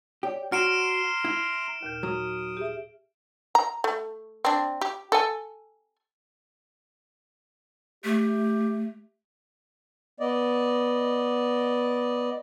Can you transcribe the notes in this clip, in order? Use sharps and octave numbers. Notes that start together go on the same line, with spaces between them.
G4 C#5 D5
F#4 A#5 C6 F6 D7 E7
E4
D#2 A#2 G6
F#3 D#6
G4 G#4 E5
A#5
A3
C4 D4
G4
A4 G#5
A3 G4
B3 D5 D#5